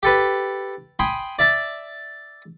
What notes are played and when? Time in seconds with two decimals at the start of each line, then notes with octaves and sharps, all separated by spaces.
0.03 G4 A4 B4
0.99 G5 G#5 B5 C6 D#6
1.39 D5 E5 A5